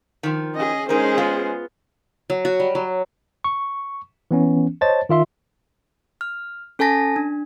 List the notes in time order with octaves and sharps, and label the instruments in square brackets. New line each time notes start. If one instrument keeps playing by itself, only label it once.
[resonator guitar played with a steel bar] D#3 F3
[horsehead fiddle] C#4 G#4 [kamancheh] D#5
[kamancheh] G#3 C5 [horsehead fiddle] C#4 G#4 [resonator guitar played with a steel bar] D#4 A#4
[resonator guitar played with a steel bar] B3 F4
[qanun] F#3
F#4
G3
F#3
[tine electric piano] C#6
E3 B3 C#4
C5 C#5 D#5 A5 A6
D#3 F4 E5 C6
[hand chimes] F6
C#4 A4 G#5 A5 A#6
D4